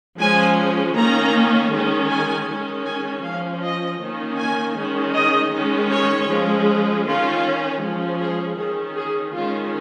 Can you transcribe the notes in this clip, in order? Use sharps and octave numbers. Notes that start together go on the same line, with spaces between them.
F3 G#3 C#4 G#5
D#3 A#3 C#4 A#5
D#3 G#3 C#4
G#5
D#3 G#3 C#4
G#5
F3 C#4 F5
D#5
D#3 A#3 C#4
G#5
D#3 G#3 C#4
D#5
D#3 G#3 C#4
C#5
F3 G#3 C#4
D#3 C#4 F4
F3 G#3 C#4
G#4
D#3 C#4 G#4
G#4
D#3 G#3 C#4 F4